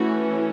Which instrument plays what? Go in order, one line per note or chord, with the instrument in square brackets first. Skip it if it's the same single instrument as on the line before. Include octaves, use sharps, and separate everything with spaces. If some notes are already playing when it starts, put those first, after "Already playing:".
Already playing: [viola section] E3 A3 C#4 F#4